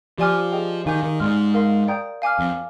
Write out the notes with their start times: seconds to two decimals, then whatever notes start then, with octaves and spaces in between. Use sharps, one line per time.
0.18 F3 G4 D5 G#5 D6 F6
0.52 G#4 D#5 G5
0.86 D#3 F5 G#5 D6 G6
1.03 D#3
1.20 G#2 D5 G#5 C6 F6
1.54 A#4 F5 C6
1.88 D5 G5 A#5 D#6 G6
2.22 F5 G#5 D6 F6
2.39 F2